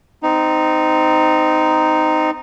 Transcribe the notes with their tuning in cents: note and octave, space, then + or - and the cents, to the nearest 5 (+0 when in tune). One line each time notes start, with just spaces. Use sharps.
C4 -25 D#4 +0